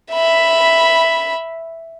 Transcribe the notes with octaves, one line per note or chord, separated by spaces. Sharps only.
E5 B5